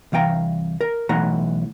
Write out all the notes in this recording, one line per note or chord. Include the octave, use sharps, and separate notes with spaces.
C2 E3 F5 G5 A#5
A#4
B1 E3 A3 F#5 A#5